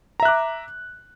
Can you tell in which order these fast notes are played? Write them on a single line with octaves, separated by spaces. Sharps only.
A#5 E5 F#6 D6